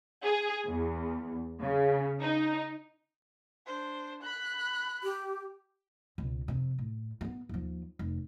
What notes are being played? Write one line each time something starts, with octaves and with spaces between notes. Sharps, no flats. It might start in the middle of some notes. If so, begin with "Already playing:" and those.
G#4
E2
C#3
D#4
D4 C5
B5 F#6
G4
C#2 B2
F2 C3
A2
A3 B3
D#2 F3
F1